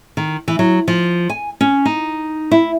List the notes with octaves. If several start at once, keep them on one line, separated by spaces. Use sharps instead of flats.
D#3
E3
F#3
F3
G#5
C#4
D#4
E4